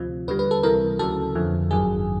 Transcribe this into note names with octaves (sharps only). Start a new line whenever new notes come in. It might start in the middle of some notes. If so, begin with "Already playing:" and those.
Already playing: D2 C3 F3
D#2 D3 G3 B4
B4
A4
C#2 C3 E3 G3 A#4
D2 C#3 F#3 A4
F2 D3 F3
G#1 F#2 D#3 F#3 G#4